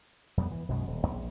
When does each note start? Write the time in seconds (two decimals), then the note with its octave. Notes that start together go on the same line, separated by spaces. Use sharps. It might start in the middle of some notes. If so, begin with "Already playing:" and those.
0.37 F2 G3 B3
0.52 E3
0.68 B1 F#2 B2 G#3
0.87 D#1
1.07 A#1